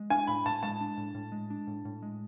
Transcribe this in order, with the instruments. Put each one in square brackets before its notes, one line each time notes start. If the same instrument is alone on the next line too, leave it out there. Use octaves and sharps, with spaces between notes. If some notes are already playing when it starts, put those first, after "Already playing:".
Already playing: [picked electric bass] G#3
[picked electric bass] D4 [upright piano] G#5
[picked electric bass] A2 [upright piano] B5
[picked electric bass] A2 [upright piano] A5
[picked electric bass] G#3 [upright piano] A5
[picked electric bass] D4
A2
A2
G#3
D4
A2
A2
G#3